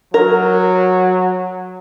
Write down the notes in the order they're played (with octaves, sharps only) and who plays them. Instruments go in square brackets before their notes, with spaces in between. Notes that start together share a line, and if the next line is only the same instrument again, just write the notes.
[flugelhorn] F#3 [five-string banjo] A#4